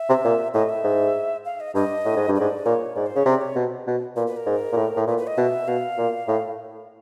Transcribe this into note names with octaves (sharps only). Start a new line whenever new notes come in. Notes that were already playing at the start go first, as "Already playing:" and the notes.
Already playing: E5
C3
A#2
A2 D#5
E5
G#2
F5
D#5
G2 D#5
A2
G#2
G2
G#2 D5
A#2 C#5
G#2 D5
C5
C#3 C#5
C3 D5
C#5
B2
B2
A#2 B4
B4
A#4
G#2
A#2
A2
A2
A#2 B4
B4
D#5
B2 E5
B2 F5
A#2
A2